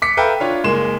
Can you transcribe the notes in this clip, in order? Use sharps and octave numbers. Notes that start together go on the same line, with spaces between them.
D6 B6 C#7
A4 B4 E5 F5 G5 A#5
D4 F4 C#5 F5
F#1 G#3 A#3 C6 E7